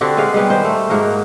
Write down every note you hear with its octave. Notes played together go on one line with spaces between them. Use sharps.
D3 C4 F#4 G4
G#3 G#4 B4 F5
G3 G#3 B3 G4
D#3 C5
A3
G#2 A#3 F#4 A#4